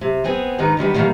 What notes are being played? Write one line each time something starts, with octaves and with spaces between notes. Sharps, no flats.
C3
B3 C4 G#4
G#2 D3 D#3 D#4 B4 A#5
D3 D#3 G3 B3
B2 D#3 E3 F#3 G3 A#3